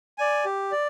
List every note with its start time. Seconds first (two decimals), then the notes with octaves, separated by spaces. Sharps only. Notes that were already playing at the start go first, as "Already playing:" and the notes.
0.18 D5 G#5
0.45 G4
0.72 D5